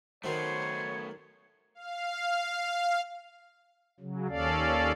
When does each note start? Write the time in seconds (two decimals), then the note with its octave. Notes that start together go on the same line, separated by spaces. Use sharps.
0.24 D#3 F#3 A3 B3 C5 C#5
1.75 F5
4.00 C#3 F#3
4.29 D#2 C#4 A4 D5 F5